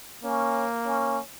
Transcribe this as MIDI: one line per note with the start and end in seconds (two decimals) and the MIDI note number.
0.23 1.20 58
0.23 0.64 61
0.85 1.18 61